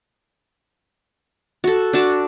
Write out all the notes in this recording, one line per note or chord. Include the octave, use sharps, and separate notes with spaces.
F#4 A4
D4 F#4 A5